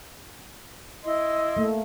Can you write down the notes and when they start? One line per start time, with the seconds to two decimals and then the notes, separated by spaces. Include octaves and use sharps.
1.03 E4 D#5 C6
1.57 A3 A#3